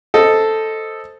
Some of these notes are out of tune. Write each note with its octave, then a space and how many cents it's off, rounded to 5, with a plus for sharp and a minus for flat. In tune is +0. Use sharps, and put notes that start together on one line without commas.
A4 +0 C5 +0 D#5 +0